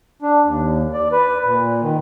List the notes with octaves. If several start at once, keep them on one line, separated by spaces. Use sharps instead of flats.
D4
D#2
D5
B4
A#2
D#3